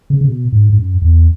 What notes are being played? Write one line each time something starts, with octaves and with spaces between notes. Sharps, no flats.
C#3
C#3
B2
G#2
G#2
F#2
E2